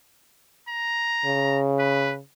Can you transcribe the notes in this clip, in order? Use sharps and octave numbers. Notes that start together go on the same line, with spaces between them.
A#5
C#3
B4